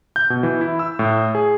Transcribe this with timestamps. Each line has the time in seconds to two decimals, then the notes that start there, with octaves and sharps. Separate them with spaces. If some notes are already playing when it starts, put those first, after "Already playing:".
0.16 G6
0.30 B2
0.43 E3
0.61 E4
0.79 E6
0.99 A2
1.35 G#4